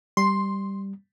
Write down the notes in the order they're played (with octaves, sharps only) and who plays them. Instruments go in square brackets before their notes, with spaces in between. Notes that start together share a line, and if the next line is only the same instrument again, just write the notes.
[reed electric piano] G3 [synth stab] C6